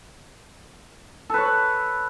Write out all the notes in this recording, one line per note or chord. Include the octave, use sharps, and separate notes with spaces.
A4 B4 C#5